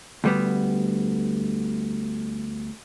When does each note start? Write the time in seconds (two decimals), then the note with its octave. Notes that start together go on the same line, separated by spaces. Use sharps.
0.24 D2 G3 B3